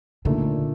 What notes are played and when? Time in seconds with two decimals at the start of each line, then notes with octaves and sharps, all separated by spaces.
0.25 A#2 D3 A3 D#4 A#4